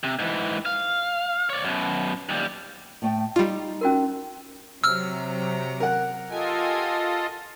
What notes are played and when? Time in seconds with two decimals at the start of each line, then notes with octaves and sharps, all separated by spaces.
0.04 C3
0.19 G#2 E3
0.66 F5
1.50 C#5 D5
1.65 F#2 B2
2.29 D#2 G3
3.02 A2 A3 G5
3.36 G3 D#4 F4 G4
3.81 C#4 F#4 A#4
4.84 C3 F#3 A#5 E6 F6
5.80 A#4 F#5
6.30 F4 G4 A4 D#5 G#5